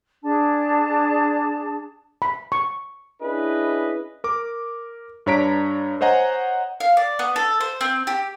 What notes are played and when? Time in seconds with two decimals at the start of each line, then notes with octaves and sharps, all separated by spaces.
0.24 D4 G#4 A5
2.22 B5
2.52 C#6
3.23 C#4 D4 E4 G#4 B4 D#5
4.24 A#4 D6
5.26 G2 D4 C#5 A#5 B6 D7
6.01 C5 C#5 D#5 F#5 G#5 A#5
6.80 F5
6.97 D5
7.19 B3
7.36 A4
7.61 C5
7.81 C4
8.07 G4